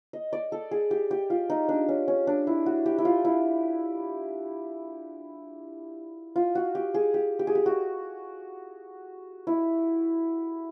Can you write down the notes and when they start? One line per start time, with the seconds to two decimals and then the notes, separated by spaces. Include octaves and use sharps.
0.13 D#5
0.33 D5
0.52 A4
0.71 G#4
0.91 G4
1.11 G4
1.30 F4
1.50 D#4
1.69 D4
1.89 C#4
2.08 C#4
2.27 D4
2.47 E4
2.66 F#4
2.86 G4
2.98 E4
3.05 F4
3.25 E4
6.36 F4
6.55 F#4
6.75 G4
6.94 G#4
7.14 G4
7.39 G4
7.47 G#4
7.55 G4
7.66 F#4
9.47 E4